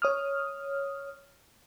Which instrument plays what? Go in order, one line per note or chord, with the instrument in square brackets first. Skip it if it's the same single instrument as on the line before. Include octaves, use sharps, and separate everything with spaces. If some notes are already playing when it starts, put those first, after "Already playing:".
[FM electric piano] C#5 D#6 F6